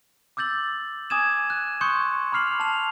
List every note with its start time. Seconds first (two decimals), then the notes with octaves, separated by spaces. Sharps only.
0.37 D6 E6 G6 A6 F#7
1.10 G#5 D6 D#6 G#6 D#7 E7
1.50 F#6
1.81 C6 C#6 D#6 F#6 G6 C#7
2.32 B5 D6 F6 C7 F7 F#7
2.60 A5 F7